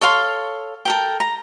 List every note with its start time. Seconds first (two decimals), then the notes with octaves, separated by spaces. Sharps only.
0.01 A4 C#5 F5 C6
0.85 A4 A#4 G5
1.20 A#5